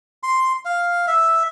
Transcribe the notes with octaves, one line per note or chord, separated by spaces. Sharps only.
C6
F5
E5